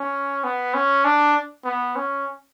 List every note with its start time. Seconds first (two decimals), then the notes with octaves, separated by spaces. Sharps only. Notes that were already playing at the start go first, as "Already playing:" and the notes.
Already playing: C#4
0.44 B3
0.74 C#4
1.05 D4
1.65 B3
1.96 C#4